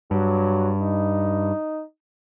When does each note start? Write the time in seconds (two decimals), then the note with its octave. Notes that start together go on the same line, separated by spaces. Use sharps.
0.11 G2 F#3
0.82 D#4